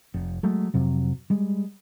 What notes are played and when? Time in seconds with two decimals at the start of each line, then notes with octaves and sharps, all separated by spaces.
0.14 F1
0.43 F#3 G#3 A3
0.74 F2 C3 F#3
1.30 G3 G#3